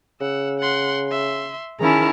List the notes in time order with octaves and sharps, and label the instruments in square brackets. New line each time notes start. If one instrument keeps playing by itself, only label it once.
[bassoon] C#3 [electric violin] F#5 E6
[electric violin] F#5 C6
E5 C6
[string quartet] D#3 C#4 E4 [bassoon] G#4 [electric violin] A5 A#5